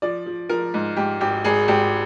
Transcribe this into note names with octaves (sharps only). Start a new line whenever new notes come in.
F3 D5
F3
F3 A#4
G#2
G#2 G4
G#1 G4
G#1 G#4
G#1 G4